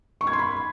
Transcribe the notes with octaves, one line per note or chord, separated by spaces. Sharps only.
C#6
G#6
C6
B5